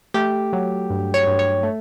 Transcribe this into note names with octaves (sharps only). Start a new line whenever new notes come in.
A3 G4
F#3
G2
C#5
G2
C#5
A3